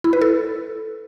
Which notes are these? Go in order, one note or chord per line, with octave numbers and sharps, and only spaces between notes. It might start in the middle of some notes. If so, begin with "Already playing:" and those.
E4
B4
A4